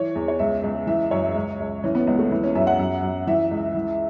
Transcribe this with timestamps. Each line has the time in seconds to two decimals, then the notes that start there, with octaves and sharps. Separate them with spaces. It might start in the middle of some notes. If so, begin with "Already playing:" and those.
Already playing: E3 C#5
0.15 E2
0.28 C#5
0.39 C#2 E5
0.63 C#2
0.87 E3 E5
1.11 F#2 C#5
1.35 C#2
1.60 C#2
1.83 E3 C#4
1.95 B3
2.07 C#2 B3
2.19 A3
2.31 E3 B3
2.44 C#4
2.55 F#2 E5
2.67 F#5
2.79 F#2
3.03 F#2
3.27 E3 E5
3.51 C#2
3.75 E3